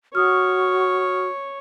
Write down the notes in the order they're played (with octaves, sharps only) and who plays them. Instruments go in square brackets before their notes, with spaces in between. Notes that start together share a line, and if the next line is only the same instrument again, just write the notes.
[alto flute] F#4 [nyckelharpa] C#5 [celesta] D#6 F6